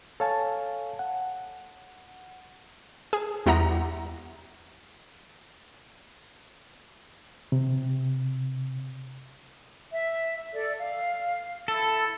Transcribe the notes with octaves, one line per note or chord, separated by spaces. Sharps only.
A4 C#5 F5 G#5 A5
F#5
G#4
E2 G3 E4 F#5 A#5 D#6
C3
E5
A4 D5
F5
E4 A4 E6